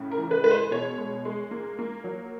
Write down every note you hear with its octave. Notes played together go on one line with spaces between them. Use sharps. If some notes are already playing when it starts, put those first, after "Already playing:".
Already playing: A2 C#3
A#4
E3
B4
G#3 B4
C5
B2 C#5
G#3
G#3
A#3
A#3
F#3